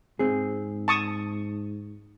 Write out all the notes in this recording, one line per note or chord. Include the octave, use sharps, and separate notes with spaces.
G#2 C4 G#4
A5 C#6 D#6